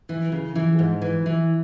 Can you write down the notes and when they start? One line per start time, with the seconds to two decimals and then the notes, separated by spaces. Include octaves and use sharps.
0.09 E3
0.32 C#3
0.55 E3
0.79 G#2
1.02 E3
1.26 E3